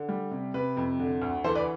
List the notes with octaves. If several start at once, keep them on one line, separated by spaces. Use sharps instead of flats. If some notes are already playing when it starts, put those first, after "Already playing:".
Already playing: D3
G3
C3
C3 B4
F2
D3
D2
E3 A4 C5
B4 D5